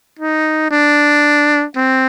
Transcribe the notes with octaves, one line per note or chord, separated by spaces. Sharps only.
D#4
D4
C4